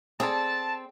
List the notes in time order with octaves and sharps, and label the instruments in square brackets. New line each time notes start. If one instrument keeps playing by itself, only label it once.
[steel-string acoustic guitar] C4 [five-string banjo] G#4 A4 D5 [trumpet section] A5